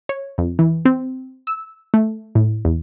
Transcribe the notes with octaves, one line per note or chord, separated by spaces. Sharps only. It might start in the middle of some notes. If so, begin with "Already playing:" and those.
C#5
F2
E3
C4
E6
A3
A2
E2